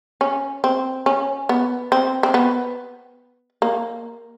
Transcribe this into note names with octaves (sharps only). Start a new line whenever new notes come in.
C#4
C4
C#4
B3
C4
C4
B3
A#3